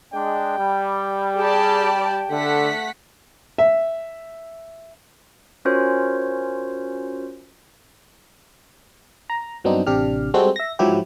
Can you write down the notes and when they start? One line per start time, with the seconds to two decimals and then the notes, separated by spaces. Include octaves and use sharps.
0.13 G#3 D4 G5
0.58 G3
1.37 G4 G#4 D5 A5
2.31 D3 A3 F#5 B6
3.58 E5
5.65 C#4 F4 F#4 A#4 C5 C#5
9.30 A#5
9.64 G2 F#3 B3 C4 D4 D#4
9.87 A1 C3 D4 G4 F6
10.34 G3 G#3 C4 F#4 A4 C5
10.56 E5 A#6
10.79 G#2 F3 F#3 E4 G4